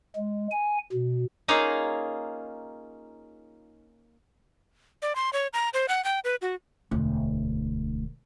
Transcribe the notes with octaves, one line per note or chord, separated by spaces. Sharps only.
G#3
G#5
B2
A#3 C#4 D#4 F4 G#4 F5
D5
C6
C#5
A#5
C5
F#5
G5
B4
F#4
E1 D2